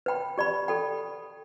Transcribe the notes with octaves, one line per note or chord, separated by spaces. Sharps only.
B4 G5 B5
G4 D5 B5
A4 G5 B5